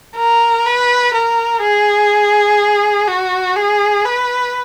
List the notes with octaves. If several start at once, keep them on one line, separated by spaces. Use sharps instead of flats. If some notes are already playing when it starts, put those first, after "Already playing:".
A#4
B4
A#4
G#4
F#4
G#4
B4